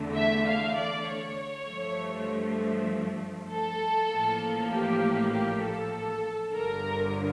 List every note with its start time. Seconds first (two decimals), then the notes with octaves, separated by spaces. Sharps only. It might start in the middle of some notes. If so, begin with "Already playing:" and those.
Already playing: E2 D3 A3
0.16 E5
0.47 F5
0.77 D5
1.07 C#5
1.68 G2 F3 A3
3.50 A4
4.11 A1 A2 F3 A#3
4.71 G4
5.32 G4
5.63 A4
6.53 G1 G2 D3 A#4